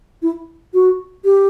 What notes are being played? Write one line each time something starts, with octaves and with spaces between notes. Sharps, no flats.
E4
F#4
G4